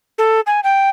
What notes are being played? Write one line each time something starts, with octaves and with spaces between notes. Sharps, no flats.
A4
G#5
G5